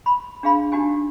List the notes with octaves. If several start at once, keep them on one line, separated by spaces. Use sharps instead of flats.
B5 C6
D4 G#4 F5 B5 C6
D4 D#4 F#4 G4 G#5